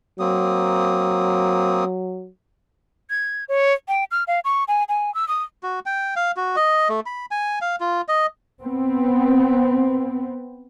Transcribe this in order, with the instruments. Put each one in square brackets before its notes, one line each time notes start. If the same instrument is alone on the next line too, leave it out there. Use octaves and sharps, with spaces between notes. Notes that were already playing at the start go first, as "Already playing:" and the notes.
[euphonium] F#3 [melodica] A#3 C4 D#6
[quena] G#6
C#5
G5
F6
F5
C#6
G#5
G#5
E6
D#6
[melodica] F#4
G5
F5
F#4
D#5
A3
B5
G#5
F5
F4
D#5
[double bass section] B3 C4